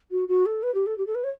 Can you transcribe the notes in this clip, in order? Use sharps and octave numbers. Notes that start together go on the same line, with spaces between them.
F#4
F#4
A4
B4
G4
A4
G4
A4
B4
C#5